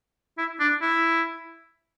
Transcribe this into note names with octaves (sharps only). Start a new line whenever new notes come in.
E4
D4
E4